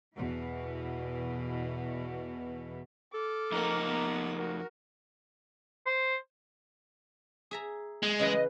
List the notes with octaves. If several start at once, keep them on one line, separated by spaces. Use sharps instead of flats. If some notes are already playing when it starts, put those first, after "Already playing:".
E2 B2 E3
A4 D6 F6
F2 A#3 D#4 F#5
B3
F#4 A#4
C5
G#4 E5 A#5
G#3
C#3 E3 B4 D#5